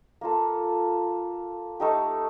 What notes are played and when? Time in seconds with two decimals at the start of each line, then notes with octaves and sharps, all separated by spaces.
0.21 A#3 F4 A4
1.80 A3 D#4 G4